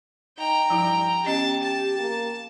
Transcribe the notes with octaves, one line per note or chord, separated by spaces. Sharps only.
D#4 G5 A#5
G2 F3 E4
B3 C#4 G4 D#5 A5
A5
A#3